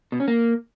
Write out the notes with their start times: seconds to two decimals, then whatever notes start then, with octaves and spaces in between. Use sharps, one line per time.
0.12 B2
0.20 C#4
0.28 A#3